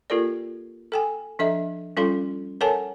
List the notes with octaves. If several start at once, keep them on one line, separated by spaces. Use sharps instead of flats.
A#3 F4 G4 A4 A#4 D5
A4 G5 G#5
F3 D4 A4 D#5 E5
G3 C#4 F4 A4 F5 C6
A4 A#4 C#5 F#5 G#5 A5